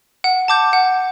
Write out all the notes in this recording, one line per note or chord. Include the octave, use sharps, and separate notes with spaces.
F#5
A5 D6 G6
F#5